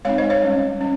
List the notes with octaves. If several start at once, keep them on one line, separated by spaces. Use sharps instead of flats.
G#3 C4 D#4 C#5 F5
C5 D#5
C#5 F5
G3 C#4
C#4